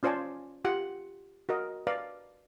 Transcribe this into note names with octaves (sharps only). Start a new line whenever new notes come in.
C#4 F4 C5 D5 G#5 A5
F4 G4 F#5
F#4 A#4 D#5
B4 D5 F5 A#5